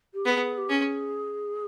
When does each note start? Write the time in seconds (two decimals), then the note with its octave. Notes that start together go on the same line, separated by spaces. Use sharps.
0.14 G4
0.25 B3 G#4
0.58 G4
0.69 C#4 G#4